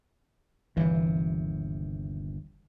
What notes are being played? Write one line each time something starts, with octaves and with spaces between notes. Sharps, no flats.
G1 D#2 C3 E3